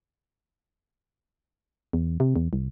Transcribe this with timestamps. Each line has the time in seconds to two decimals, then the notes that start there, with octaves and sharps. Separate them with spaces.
1.93 E2
2.20 C3
2.36 E2
2.53 C2